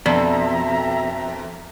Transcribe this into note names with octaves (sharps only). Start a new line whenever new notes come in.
F2 B2 D5 E5 A#5